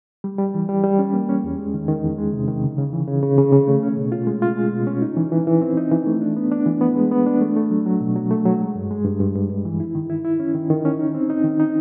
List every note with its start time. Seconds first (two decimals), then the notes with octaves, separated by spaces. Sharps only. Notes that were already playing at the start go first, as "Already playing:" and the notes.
0.24 G3
0.39 G3
0.54 E3
0.69 G3
0.84 G3
0.99 C#4
1.14 A#3
1.29 C#4
1.44 E2
1.59 G#3
1.74 D#3
1.88 D#3
2.04 E2
2.18 G#3
2.33 C3
2.48 D#3
2.63 C#3
2.78 C#3
2.93 E3
3.08 C#3
3.23 C#3
3.38 C#3
3.53 C#3
3.67 A3
3.83 C#4
3.97 B2
4.12 F4
4.27 G#3
4.42 F4
4.57 G#3
4.72 B2
4.87 C#4
5.02 D#4
5.17 E3
5.32 E3
5.47 E3
5.62 C4
5.77 D#4
5.91 E3
6.06 A3
6.21 D4
6.36 B3
6.52 D4
6.66 E3
6.81 B3
6.96 G#3
7.11 B3
7.26 D4
7.41 A3
7.56 A3
7.70 F#3
7.86 F#3
8.01 B2
8.16 F#3
8.31 A3
8.45 F#3
8.60 G#3
8.75 G2
8.91 G#3
9.05 G2
9.20 G2
9.35 G2
9.50 G2
9.65 E3
9.80 E4
9.95 D#3
10.10 E4
10.25 E4
10.40 C#4
10.55 D#3
10.70 D#3
10.85 C#4
10.99 D#4
11.15 C4
11.30 D#4
11.44 D#3
11.60 D#4